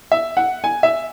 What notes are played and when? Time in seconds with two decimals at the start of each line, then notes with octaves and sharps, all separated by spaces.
0.11 E5
0.37 F#5
0.64 G#5
0.83 E5